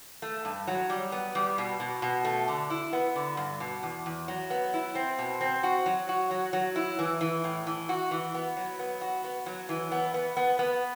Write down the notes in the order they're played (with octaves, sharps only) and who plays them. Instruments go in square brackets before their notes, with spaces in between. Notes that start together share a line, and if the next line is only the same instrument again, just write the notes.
[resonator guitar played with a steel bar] A3
G2
F#3
G3
B3
G3
B2
B2
B2
A3
D3
E4
B3
D3
G2
B2
E2
E2
F#3
B3
E4
C4
B2
C4
F#4
F#3
F#4
F#3
F#3
E4
E3
E3
A2
E3
F#4
E3
B3
F#3
B3
F#4
B3
F#3
E3
B3
B3
B3
B3